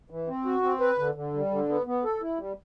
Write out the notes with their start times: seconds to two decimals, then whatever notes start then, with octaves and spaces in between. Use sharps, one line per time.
0.10 E3
0.27 C4
0.45 F#4
0.63 C4
0.80 B4
0.98 D3
1.15 D3
1.33 G3
1.51 D3
1.68 B3
1.86 B3
2.04 A4
2.21 E4
2.38 G3